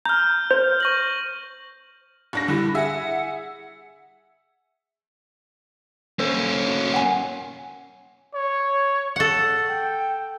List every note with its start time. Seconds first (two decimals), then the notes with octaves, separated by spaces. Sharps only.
0.05 A#5 F6 G6
0.51 C5
0.80 C#6 A#6 F#7
2.33 F#1 D4 A#6
2.48 D3 G3 E4
2.75 G#4 E5 F#5
6.19 A#3 C#4 A4 C5 C#5
6.68 F#4
6.92 C#5 F#5 G#5
8.34 C#5
9.16 A4 F#5
9.69 G5